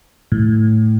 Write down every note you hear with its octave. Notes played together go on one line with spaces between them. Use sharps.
A2